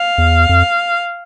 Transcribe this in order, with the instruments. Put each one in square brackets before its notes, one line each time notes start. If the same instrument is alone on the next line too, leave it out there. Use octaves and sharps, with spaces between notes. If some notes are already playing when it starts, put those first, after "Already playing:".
Already playing: [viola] F5
[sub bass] E2
F2